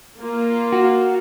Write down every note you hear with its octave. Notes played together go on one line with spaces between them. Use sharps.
A#3 F4
F#4